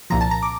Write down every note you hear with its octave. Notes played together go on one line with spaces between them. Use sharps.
C2 A#2 F3 A#5
A5
A#5
D6